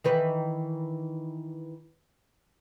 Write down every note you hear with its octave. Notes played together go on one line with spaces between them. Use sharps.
D#3 E3 B4